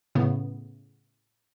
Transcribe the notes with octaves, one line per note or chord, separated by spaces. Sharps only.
A2 C#3 A3 B3